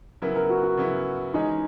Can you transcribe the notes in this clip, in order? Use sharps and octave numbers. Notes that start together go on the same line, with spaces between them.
C#3 F#3 B3 E4 A#4
A#4
F#4
F#4
C#3 F#3 B3 E4
E3 G#3 C#4 D#4 G#4